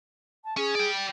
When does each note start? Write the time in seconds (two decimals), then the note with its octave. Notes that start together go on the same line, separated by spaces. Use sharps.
0.44 A5
0.57 C#4 G#4
0.75 D5 G5